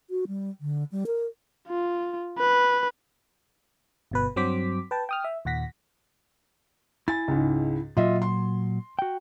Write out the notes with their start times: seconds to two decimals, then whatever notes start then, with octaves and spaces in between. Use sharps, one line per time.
0.10 F#4
0.28 G3
0.61 D3
0.92 G3
1.07 A#4
1.68 F4
2.39 B4
4.11 G1 B2 B4
4.36 G2 F#3 C4 C5 D6 B6
4.91 B4 G5 A5
5.09 G5 D#6 F6
5.24 E5
5.45 D#2 A#2 F#5 A#6 B6
7.08 E4 G#5 A6
7.28 C#2 G#2
7.97 A#2 F#3 F4 D#5 E5
8.22 C6
8.99 F#4 G5